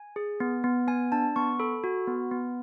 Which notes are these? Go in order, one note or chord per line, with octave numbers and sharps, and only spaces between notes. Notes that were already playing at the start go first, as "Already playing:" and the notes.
Already playing: G#5
G#4
B3
B3
B3 G#5
D4 A5
B3 C#6
A4 B5
F#4
B3
B3